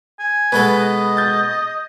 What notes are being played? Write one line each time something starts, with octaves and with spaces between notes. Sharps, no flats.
G#5
B2 G#3 A4 B4
D#5
G6 A6